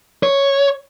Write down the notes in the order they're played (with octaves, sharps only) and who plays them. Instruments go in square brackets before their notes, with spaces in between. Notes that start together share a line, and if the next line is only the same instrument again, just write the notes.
[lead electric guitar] C#5